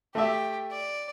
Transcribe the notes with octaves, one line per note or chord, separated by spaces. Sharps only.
A3 G4 E5
D5